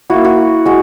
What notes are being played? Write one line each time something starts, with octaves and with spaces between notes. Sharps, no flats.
A#3 E4 F#4
F#4
G#3 F#4